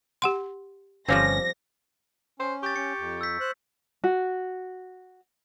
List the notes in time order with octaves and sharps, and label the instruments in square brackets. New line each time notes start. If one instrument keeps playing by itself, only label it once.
[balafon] G4 F#5 C6
[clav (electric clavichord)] G1 C#4 F5 [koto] F3 G3 C4 [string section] A#6
[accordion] C#4 [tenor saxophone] C5
[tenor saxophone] G4 [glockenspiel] C#6 A6
[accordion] C#4 [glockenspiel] C#7
[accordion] F2
[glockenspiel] E6 G6 B6
[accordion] C5 F#6
[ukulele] F#4